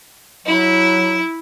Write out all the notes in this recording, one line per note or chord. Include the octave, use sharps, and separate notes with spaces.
F#3 E4